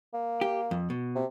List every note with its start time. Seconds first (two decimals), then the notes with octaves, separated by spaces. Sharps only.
0.14 A#3
0.41 G4
0.71 F2
0.90 B2
1.15 C3